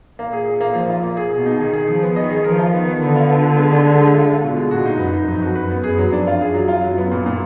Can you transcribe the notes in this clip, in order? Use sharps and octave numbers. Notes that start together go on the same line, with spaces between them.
A#2 A#3
G#4
G#4
A#3
F3
F4
A#3
G#4
B2 G#4
D#4
D#3 G#4
G#4
F3 G#4
B3
D#3 D#5
G#4
F3 A#4
F4
D#3 B3
B3
D3 B3
F4
B3
B3
G#3
D4
G#3
G#3
F4
F4
B2
G#3
A#2 F#4
D#4
F#2 B4
D#4
F2 D#4
F#4
F#2 B4
B3
F#2 G#4
F#3
F2 D4
F4
F#2 G#4
F#3
F4
F#3
B3
A#2
A#2